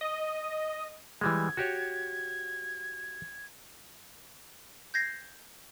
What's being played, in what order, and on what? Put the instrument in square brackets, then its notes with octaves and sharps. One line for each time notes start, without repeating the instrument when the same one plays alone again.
[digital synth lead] D#5
[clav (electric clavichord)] E3 G3 G#3 [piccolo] G#6
[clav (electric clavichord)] F#4 G4 C#5
[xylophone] G6 G#6 A#6 C7